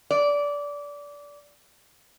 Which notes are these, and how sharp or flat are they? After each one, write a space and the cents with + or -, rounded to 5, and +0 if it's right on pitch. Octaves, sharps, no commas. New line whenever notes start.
D5 -20